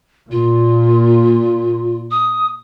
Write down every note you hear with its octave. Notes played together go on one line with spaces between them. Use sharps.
A#2 F4
D#6